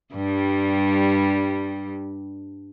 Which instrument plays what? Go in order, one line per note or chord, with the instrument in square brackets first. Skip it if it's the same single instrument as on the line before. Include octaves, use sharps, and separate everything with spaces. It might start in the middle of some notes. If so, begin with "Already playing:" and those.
[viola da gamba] G2 G3